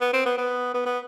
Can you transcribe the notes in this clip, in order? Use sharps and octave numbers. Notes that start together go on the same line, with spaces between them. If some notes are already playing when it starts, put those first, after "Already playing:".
B3
C4
B3
B3
B3
B3